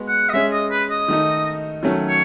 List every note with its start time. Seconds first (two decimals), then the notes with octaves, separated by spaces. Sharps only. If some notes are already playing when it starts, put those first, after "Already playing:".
Already playing: G#3 B3 F#4
0.09 F#5
0.29 D#5
0.33 G#3 C#4 G#4 E5
0.53 D#5
0.71 B4
0.90 D#5
1.08 D#3 A3 D#4
1.83 D#3 F#3 A3 C#4
2.08 C#5